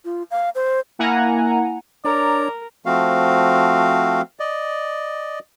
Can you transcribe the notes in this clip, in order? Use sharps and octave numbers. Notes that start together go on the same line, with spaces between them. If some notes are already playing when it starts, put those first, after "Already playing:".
F4
F5
C5
A#3 E4 F#5 G#5 A#5
D4 A#4 C#5 D5 A#5
F3 A3 C4 F#4 F5
D5 D#5